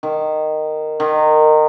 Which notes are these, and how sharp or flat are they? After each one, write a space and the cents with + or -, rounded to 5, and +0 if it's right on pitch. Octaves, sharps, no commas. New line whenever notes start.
D#3 -10
D#3 -20